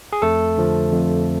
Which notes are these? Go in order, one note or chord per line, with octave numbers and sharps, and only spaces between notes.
G#4
F2 A3 A4
D3 F3
F2